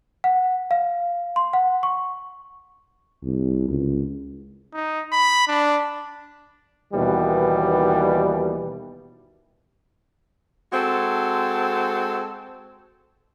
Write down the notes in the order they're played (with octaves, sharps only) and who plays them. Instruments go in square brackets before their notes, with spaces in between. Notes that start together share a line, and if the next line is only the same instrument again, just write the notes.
[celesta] F#5
F5
C6
F#5
C#6
[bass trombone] C2
C#2
[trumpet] D#4
B5
D4
[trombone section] D#2 B2 D#3 E3 G3
[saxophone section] G#3 C4 F#4 A4